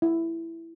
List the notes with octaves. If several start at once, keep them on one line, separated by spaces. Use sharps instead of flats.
E4